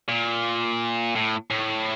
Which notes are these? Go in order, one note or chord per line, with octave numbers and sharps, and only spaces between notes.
A#2
A2
A2